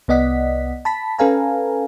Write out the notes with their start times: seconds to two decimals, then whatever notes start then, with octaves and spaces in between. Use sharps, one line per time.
0.08 C2 B3 D5 D#5 F#5 B6
0.85 A5 B5 B6
1.19 C#4 A4 B4 F5 G#5 A#5